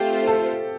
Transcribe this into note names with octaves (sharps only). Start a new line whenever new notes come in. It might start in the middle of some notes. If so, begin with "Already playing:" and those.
Already playing: A3 C4 F4 G4 C5
A4